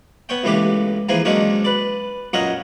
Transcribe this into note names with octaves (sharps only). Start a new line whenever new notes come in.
B3 C#5 G5
C#2 A2 E3 A#3 G4 D6
E3 F3 A#3 G#4 G#5
D#3 F#3 G#3 A#3 C#4 D4
B4 D5
F#2 A#2 A#4 C#5 D#5 F#5